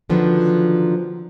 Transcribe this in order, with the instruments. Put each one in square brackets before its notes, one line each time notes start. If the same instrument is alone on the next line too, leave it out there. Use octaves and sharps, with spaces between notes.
[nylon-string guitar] D3 D#3 F3 F#3 B3